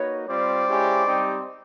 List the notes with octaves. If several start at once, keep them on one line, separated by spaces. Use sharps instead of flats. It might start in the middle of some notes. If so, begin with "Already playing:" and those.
Already playing: A#3 D#4 F#4 B4 C#5
G3 C4 F4 C5 D5
G#3 C#4 E4 G4
G3 C4 D#4 G4